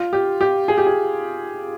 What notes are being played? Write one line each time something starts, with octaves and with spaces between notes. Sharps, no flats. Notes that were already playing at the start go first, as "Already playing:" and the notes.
Already playing: F4
G4
G4
G#4
G4
G#4